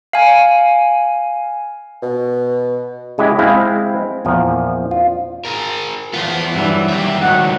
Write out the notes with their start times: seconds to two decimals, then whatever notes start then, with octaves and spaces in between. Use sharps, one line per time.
0.13 F5 G#5
2.03 B2
3.18 C#3 G#3 E4 G4
3.39 G#3 C4 E4 F5
4.25 E2 A#2 F3
4.91 F4
5.45 G#4 A#4
6.13 E2 B3 F4 C5
6.53 G2 E3 F#3 G3
6.89 D#2 D#3 G4 E5
7.21 C#2 G#2 F#3 F#5